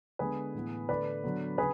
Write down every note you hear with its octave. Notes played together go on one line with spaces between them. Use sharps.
D3 G#3 B3 G#4 B4
A2 E3 B3
D3 A3 B4 D5
D3 F#3 B3
C#3 G#4 B4